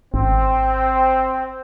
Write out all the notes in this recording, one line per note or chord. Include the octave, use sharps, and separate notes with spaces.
G#1 C4